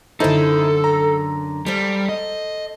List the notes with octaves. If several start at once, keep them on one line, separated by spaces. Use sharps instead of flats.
F#2 D3 D#4 E4 A4 C5
A#5
G3 A4 C5
D#5